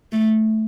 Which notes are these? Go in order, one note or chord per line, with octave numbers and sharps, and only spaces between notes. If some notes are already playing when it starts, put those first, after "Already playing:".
A3